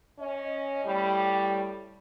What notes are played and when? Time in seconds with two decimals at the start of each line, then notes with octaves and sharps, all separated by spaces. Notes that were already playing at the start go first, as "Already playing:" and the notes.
0.19 C#4 D#5
0.84 A2 G3